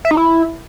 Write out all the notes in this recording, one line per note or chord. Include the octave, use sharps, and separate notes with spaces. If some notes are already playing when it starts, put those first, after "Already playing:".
E5
D#4
E4